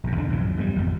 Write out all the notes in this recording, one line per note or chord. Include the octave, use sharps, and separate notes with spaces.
A#1 F#2
E2 C#3 A#3 D4
B1 E2 A2 F3
F#2
E2 G#2 D3 G3
G#1 F2